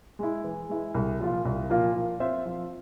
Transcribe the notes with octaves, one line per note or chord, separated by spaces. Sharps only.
G#3 E4
E3
G#3 E4
C2
A#2 F3 A#3 F4
C2
A#2 F3 A#3 F4
F3
C4 F4 C5 E5
F3